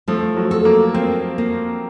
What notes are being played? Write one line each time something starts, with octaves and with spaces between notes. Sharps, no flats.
F3 A3
F#3
A4
A#3
A#3 C4
A#3